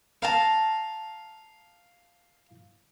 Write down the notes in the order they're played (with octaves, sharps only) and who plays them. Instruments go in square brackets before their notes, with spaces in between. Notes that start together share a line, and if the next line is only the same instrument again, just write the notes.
[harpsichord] F5 [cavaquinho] A5 A#5